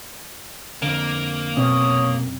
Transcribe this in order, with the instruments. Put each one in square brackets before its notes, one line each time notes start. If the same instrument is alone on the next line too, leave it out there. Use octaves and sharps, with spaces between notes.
[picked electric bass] F2 D3 [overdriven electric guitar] A#3
[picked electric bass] F1 F#2 C4 [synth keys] B2 [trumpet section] C#5 D#6